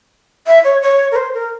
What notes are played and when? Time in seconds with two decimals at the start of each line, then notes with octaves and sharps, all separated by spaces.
0.47 E5
0.64 C#5
0.82 C#5
1.11 A#4
1.16 C5
1.34 A#4